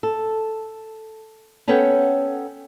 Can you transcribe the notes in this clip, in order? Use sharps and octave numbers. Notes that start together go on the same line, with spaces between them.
A4
B3 C#4 A4 C#5 F#5 G5